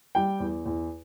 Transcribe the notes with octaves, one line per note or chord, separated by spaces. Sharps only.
G3 G5
E2
E2